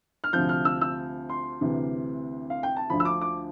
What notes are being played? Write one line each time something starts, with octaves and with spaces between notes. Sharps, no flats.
F6
D2 C3 F3 G6
F6
E6
E6
C6
D2 C3 E3
F5
G5
A5
D2 D3 F3 B5
E6
D6
D6